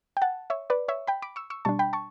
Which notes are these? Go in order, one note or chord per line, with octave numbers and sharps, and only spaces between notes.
G5
F#5 A5
C#5 E5
B4 D5
C#5 E5
G5 B5
B5 D6
C#6 E6
C#6 E6
B2 G3 D4 A5 C#6
G5 B5
A5 C#6